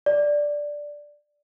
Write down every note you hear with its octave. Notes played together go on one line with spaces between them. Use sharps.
D5